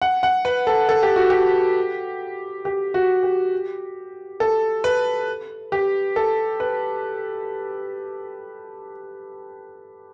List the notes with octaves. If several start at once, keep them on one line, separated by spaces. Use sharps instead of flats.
F#5
F#5
B4
A4
A4
G4
F#4
G4
G4
F#4
G4
A4
B4
G4
A4
B4